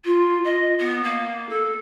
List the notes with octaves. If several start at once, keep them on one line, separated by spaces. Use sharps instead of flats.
F4
D#5
B3
A#3
A4